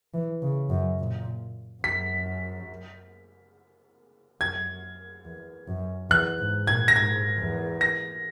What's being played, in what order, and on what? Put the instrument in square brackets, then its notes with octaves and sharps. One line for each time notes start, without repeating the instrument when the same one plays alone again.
[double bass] E3
C#3
F#2
A#2
[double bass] F#2 [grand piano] B6
[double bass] F#2 [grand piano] G#6
[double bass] E2
F#2
[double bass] E2 [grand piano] F#6
[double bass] G#2
[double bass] A#2 [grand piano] G#6
[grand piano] A#6
[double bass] G#2 [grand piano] G#6
[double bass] E2
[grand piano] A#6